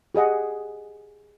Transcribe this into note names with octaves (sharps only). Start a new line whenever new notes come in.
G4 G#4 D#5 F#5